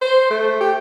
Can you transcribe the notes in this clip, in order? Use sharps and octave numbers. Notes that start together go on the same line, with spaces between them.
C5
A3
G4